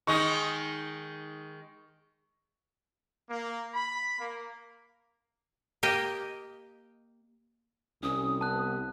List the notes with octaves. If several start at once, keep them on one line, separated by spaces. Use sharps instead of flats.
D#3 G#3 D#4 C#6
A#3
B5
A#3
A#3 G4 D#5 G5
C2 C#4 D#6
B3 A5 F#6